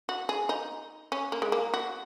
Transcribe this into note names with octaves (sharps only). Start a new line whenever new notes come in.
F#4
G#4
D#4
C#4
A#3
G#3
A#3
F#4